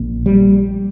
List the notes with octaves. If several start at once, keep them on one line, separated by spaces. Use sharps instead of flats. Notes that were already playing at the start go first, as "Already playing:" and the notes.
Already playing: A#1 A#2
G3